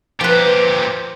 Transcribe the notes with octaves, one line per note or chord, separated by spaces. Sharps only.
A#2 F3 G4 B4